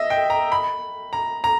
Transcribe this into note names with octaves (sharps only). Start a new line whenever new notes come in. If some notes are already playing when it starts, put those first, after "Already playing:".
Already playing: D#5 E5
G5
A#5
B5
A#5
A#5